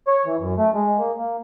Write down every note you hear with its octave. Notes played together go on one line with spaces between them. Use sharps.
C#5
E3
F#2
A3
G#3
A#3
A#3